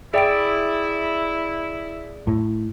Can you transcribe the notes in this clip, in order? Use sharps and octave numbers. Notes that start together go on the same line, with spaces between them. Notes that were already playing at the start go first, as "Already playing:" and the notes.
E4 G#4 D5 E5 G5 D7
A2